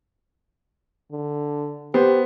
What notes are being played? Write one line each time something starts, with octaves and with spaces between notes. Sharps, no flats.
D3
B3 G4 C5